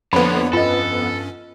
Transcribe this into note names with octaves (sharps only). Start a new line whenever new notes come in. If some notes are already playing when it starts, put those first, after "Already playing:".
F2 D3 F3 A#3 B3 D4 C#5 B5
G2 C#4 F4 A4 D#5